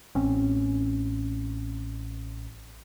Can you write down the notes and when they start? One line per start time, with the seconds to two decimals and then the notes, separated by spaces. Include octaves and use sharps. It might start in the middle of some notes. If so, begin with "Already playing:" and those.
0.15 A1 C4 C#4